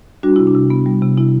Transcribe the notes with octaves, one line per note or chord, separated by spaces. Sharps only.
G3 D4 F#4
C3 E4
D4
C3
B3
G3
C3
C3 E4